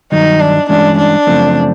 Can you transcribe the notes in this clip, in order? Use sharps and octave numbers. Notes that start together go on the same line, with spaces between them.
G2 D#3 F#3 D#4
D4
G2 E3 G#3 C#4 D4
D4
F#2 C#3 F3 A3 C4